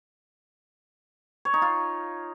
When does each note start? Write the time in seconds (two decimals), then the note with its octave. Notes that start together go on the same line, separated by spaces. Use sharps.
1.45 C#5
1.54 D#4
1.62 F4